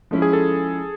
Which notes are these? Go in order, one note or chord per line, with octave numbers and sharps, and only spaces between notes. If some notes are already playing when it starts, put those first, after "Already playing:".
F3 G#3 C#4 E4
G#4
A4